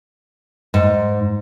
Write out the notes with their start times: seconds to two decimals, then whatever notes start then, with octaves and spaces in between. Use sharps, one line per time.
0.74 G#2